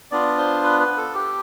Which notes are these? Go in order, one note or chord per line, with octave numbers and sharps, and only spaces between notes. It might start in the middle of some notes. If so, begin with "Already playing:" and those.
B3 D4 F4 D5
C5
B4
B4
A4
G4